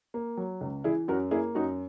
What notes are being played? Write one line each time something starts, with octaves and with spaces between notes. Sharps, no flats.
A#3
F#3
C#2
E3 E4 G#4
F#2 F#4 A#4
A#3 E4 G#4
F#2 D#4 F#4